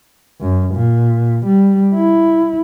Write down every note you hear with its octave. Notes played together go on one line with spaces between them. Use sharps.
F#2
A#2
G3
E4